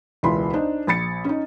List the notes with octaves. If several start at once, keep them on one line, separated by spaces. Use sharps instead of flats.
E1 C#2 E3 B5 C6
D4 D#4 C5
A#1 B5 A6 C#7
C#4 D#4